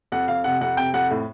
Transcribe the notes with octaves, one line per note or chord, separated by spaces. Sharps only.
F2 F#5
F2 F5
C3 F#5
F2 F#5
C3 G5
F2 F#5
A2